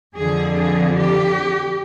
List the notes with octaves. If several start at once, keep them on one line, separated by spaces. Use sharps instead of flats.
F2 D3 F3 G#4
G#4
G4